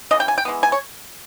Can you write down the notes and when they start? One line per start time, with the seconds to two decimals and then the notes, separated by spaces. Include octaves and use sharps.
0.11 C#3 E3 D#5
0.20 G5
0.28 G#5
0.38 G5
0.45 E3 G#3 B3
0.63 G#5
0.72 C#5